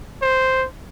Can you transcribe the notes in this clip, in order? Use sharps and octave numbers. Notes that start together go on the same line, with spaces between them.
C5